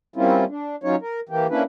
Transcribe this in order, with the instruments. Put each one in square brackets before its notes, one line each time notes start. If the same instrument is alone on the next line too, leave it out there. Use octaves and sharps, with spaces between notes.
[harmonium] G3 A#3 C4 C#4 E4 F4
D4
F#3 C#4 D#4 F4 C#5
A#4
E3 A#3 G4
A#3 C#4 D4 E4 B4